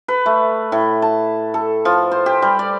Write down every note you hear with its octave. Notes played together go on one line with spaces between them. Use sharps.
B4
A3
A2
A5
A4
F3
C5
G4
G3
D5